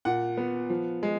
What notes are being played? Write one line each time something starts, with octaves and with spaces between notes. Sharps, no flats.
A#2 F#5
B3
F3
G#3